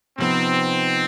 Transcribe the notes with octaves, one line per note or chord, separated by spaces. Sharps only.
C3 F3 B3 C4 D#4